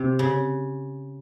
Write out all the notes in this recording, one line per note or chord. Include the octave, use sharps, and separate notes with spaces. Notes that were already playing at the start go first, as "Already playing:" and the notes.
Already playing: C3
C#3